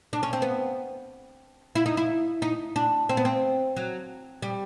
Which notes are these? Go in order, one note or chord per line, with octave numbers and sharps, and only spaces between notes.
D4
C#4
C4
B3
E4
D#4
E4
D#4
D4
C4
B3
C4
F#3
G3